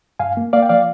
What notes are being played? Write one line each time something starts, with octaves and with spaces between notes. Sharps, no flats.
G2 F5 G#5
A#3
A#3 D5 F5
G5
F3 D5 F5